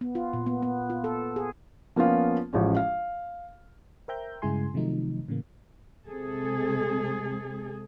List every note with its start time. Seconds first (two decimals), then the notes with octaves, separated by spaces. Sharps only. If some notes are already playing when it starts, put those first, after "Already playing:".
0.01 B3
0.15 F4
0.33 A#2
0.46 B3
0.62 B3
0.90 F4
1.04 A4
1.36 G#4
1.96 F3 A#3 B3 C#4 F4
2.53 A1 F3 G#3 C#4
2.76 F5
4.08 A#4 C5 E5 G5 A#5 G6
4.42 G2 C#3 G#3 E4 G#5 C6
4.74 C3 D#3 F3 F#3 A3 D#4
5.29 A2 C#3 E3 A#3
6.07 C3 G#3 G#4 A4